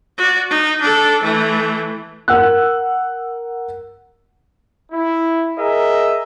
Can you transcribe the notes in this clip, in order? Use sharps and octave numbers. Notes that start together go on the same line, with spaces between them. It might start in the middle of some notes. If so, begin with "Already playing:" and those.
F#4 D5
D#4
D4 A4
E3 A3
A#4 F#5 E6 F#6
E4
G#4 A#4 D#5 E5